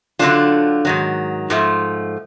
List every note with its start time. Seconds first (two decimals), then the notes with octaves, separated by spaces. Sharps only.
0.19 D3 F#3 A3 D4 F4
0.85 G#2 D#3 F#3
1.50 G#2 F3 A3